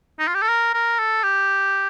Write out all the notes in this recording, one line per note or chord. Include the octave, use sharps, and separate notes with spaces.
D#4
F4
G4
A4
A#4
A#4
A4
G4